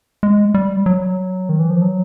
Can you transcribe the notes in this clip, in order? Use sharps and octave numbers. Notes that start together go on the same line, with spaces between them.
G#3
G3
F#3
D#3
E3
F3
F#3